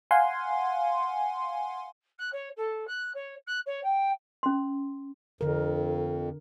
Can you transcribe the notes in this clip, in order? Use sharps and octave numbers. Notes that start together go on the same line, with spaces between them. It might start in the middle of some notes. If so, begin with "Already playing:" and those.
F5 F#5 G#5 C6
F#6
C#5
A4
F#6
C#5
F#6
C#5
G5
C#4 C6
F2 D3 A#4